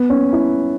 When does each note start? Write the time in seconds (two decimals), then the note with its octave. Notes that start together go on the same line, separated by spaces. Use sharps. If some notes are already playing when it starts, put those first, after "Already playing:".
Already playing: B3
0.10 C#4
0.33 E4